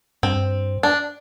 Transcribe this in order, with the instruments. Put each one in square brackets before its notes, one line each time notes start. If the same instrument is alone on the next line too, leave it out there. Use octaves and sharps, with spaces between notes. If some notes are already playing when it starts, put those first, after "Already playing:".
[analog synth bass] G2 [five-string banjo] C4
[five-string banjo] D4